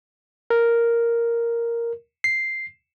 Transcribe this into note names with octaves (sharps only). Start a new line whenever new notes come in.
A#4
C7